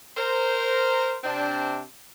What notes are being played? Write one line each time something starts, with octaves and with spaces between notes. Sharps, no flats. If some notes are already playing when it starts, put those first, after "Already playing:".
A#4 C5
C3 C4 D4